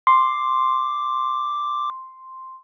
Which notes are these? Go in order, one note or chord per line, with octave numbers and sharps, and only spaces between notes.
C6 D6